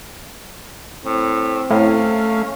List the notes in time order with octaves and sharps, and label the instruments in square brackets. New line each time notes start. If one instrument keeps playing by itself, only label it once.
[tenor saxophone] A2 [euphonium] C4
[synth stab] A2 [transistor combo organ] A3 F5 [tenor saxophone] C#4